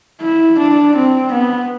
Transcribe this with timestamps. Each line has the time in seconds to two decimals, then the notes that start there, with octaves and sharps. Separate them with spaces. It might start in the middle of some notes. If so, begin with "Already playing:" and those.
0.21 E4
0.58 D4
0.96 C4
1.32 B3